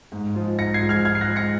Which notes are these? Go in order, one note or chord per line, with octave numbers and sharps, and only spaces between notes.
G#2
F3 G#3
G#2 A#6 C#7
G#6 C7
F3 G#3
F6 G#6
G#2 F6 G#6
C7
F#6 A#6
F3 G#3
A#6 C#7